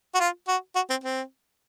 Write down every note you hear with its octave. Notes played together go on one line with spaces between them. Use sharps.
F#4
F4
F#4
F#4
C4
C4